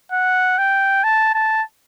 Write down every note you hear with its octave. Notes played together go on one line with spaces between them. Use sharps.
F#5
G5
A5
A5